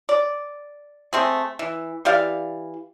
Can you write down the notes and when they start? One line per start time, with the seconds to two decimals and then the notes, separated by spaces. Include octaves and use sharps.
0.09 D5
1.13 A3 C4 G#4
1.59 E3
2.05 E3 G4 D5 F5